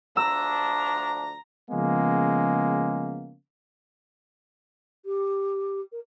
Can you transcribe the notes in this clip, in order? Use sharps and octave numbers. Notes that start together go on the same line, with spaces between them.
D2 F3 D4 A#5 E6
C#3 F3 G#3 A#3 B3 C#4
G4
A#4